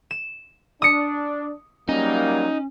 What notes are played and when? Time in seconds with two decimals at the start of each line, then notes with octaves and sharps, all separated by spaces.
0.11 E7
0.82 D4 D#6 C#7
1.89 F#3 G3 A#3 C#4 D#4